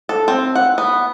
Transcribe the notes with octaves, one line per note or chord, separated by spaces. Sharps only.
A4
C4
F#5
B3